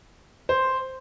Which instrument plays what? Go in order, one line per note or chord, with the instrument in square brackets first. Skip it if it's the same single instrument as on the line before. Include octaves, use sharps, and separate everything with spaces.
[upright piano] C5